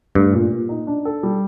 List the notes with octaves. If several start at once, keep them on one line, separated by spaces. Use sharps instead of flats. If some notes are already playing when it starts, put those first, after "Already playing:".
G2 A3
A#2
A#2
D#4
D4
A4
G3